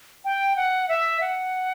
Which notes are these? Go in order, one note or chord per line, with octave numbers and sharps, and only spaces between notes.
G5
F#5
E5
F#5